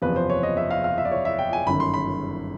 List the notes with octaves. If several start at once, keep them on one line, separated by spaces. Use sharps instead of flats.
F#1 E2 C3 F3 B4
C5
C#5
D#5
E5
F5
F5
E5
D5
C#5
E5
G5
G#5
G1 F#2 D#3 B5
C6
B5